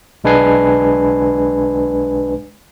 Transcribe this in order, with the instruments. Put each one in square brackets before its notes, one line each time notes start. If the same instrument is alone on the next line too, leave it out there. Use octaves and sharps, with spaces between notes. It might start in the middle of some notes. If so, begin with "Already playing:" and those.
[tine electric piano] B1 G#3 D4 B4 G#5 C7